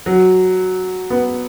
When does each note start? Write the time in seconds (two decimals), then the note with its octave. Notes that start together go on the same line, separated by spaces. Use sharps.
0.06 F#3
1.10 B3